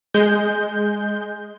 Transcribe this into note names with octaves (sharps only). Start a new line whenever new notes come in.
G#3 G6